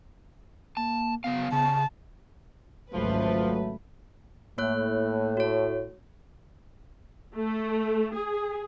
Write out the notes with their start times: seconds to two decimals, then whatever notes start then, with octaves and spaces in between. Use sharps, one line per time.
0.77 A#3 A5
1.24 C#3 F#3 B3 F5
1.52 C#3 A5
2.94 G#1 C#2 F3 F#3 A3 B4
4.58 A2 A#3 C#5 F#6
5.37 F#4 C#5
7.34 A3
8.15 G#4